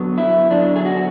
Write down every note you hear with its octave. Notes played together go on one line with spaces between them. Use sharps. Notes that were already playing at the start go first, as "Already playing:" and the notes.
Already playing: D3 F#3 B3
E4
D3 F#3 B3 D4
G#4
F#4